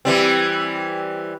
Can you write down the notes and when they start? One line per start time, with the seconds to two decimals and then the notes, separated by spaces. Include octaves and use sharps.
0.05 E3 G3 C4